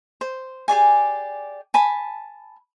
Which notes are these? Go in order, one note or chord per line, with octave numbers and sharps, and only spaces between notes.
C5
G4 G#4 D5 G#5
G#5 A5 B5